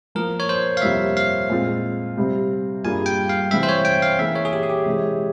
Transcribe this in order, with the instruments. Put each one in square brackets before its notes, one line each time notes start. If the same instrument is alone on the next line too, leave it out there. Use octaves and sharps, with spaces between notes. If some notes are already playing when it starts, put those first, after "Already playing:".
[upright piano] F3 A#3 F4 [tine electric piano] A#4
[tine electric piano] C#5
C5
F5
[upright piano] F2 C3 G3 A#3 F4 [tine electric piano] E5
[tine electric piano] F5
[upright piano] A#2 G#3 C4 F4
C3 G3 C4
[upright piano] G2 G3 A#3 F4 G#4 [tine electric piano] G#5
[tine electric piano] G5
F5
[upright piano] C3 E3 G3 C4 [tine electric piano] E5
[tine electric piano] C5
C#5
G5
F5
[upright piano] C#3 E3 A#3 [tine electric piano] E5
[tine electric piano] C#5
G#4
G4
G#4
G4
[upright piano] C3 E3 G#3